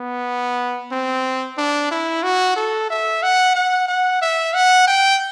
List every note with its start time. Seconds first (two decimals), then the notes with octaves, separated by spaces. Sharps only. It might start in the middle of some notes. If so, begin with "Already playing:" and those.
Already playing: B3
0.92 C4
1.58 D4
1.91 E4
2.23 F#4
2.56 A4
2.90 E5
3.23 F#5
3.55 F#5
3.88 F#5
4.22 E5
4.54 F#5
4.87 G5